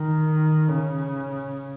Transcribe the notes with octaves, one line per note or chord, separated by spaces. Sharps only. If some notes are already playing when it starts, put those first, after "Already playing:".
Already playing: D#3
C#3